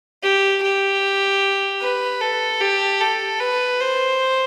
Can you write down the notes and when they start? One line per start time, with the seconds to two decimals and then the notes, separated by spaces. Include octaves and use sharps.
0.23 G4
0.63 G4
1.81 B4
2.21 A4
2.61 G4
3.00 A4
3.40 B4
3.81 C5